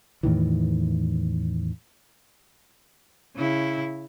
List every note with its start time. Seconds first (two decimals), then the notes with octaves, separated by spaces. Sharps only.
0.23 E2 A2 D#3 E3
3.36 C#3 E4